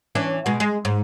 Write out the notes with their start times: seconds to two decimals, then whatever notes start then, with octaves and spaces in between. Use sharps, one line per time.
0.15 E3 C#4 D4
0.46 B2 G#3
0.60 G#3
0.85 G#2